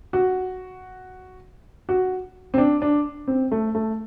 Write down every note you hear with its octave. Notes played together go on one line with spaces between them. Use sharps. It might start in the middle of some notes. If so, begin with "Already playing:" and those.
F#4
F#4
C4
D4
D4
C4
A3
A3